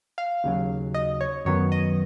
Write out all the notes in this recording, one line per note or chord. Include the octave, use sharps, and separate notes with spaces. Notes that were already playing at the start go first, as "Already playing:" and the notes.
F5
D#2 C#3 F#3
D#5
C#5
F#2 D#3 F#3 B3 C#5
D#5